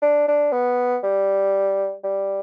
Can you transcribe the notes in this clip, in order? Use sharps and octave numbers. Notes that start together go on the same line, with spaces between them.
D4
D4
B3
G3
G3